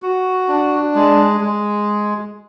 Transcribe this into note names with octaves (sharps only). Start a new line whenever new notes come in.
F#4
D4
G#3
G#3